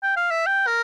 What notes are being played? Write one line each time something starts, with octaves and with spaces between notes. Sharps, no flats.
G5
F5
E5
G5
A#4